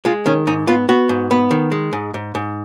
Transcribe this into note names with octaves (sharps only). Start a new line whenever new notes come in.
G#3 F4
D#3 C#4
G#2 D#4
B3 F4
B3 F#4
G#2
B3
D#3
G#3
G#2
G#2
G#2